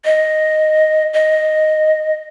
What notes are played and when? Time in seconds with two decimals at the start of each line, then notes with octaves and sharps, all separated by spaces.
0.05 D#5
1.13 D#5